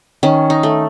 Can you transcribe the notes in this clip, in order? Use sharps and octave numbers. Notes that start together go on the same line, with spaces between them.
D#3 C#4
D#4
A3